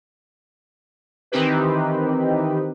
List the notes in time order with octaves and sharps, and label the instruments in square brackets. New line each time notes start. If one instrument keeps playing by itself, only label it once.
[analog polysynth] D#3 E3 C4 D#4 G4 B4